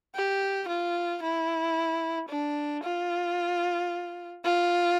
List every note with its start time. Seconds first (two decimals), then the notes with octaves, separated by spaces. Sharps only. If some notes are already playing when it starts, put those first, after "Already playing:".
0.15 G4
0.69 F4
1.22 E4
2.29 D4
2.83 F4
4.45 F4